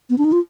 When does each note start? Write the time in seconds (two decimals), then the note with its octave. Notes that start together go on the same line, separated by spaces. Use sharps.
0.10 B3
0.18 D4
0.25 D#4
0.32 F4